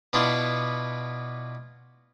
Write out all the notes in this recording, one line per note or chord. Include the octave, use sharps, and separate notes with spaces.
B2 B3 D4 E4 F4